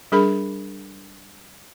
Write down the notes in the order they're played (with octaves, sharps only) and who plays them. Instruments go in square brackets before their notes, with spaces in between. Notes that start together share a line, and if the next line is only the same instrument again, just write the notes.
[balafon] G3 D4 G#4 A#4 B5